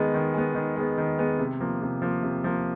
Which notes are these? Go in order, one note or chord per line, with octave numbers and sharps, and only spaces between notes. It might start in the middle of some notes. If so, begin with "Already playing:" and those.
Already playing: D#3 G#3 B3
D#3
G#3 B3
D#3
G#3 B3
D#3
G#3 B3
C3
F3 A#3
C3
F3 A#3
C3
F3 A#3